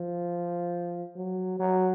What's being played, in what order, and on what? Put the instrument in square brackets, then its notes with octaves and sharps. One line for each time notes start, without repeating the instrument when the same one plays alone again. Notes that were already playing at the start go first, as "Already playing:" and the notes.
Already playing: [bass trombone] F3
F#3
F#3